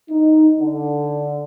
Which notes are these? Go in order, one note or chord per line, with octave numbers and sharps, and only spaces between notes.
D#4
D3